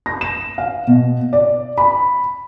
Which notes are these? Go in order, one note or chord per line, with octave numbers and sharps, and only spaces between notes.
A#6
E7
F5
B2
D5
B5